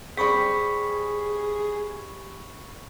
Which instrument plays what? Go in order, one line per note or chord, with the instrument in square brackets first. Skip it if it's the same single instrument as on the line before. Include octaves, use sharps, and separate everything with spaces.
[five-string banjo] G3 C4 [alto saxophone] G#4 [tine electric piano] B5 C#6 B6